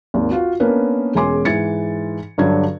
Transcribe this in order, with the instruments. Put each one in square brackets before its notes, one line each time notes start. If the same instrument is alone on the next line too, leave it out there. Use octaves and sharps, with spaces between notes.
[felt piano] G#1 D#2
F4 F#4
A#3 B3 C#4 D4 A#4 B4
E1 G#3 C#4 G#5 C6 D6
G#2 E3 G#6 A6 C#7
G2 D3 F#3 D4 G#6